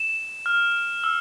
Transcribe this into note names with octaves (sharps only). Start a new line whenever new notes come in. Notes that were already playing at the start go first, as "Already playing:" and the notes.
Already playing: E7
F6
E6